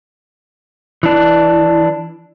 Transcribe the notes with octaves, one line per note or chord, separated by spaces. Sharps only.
E3 D4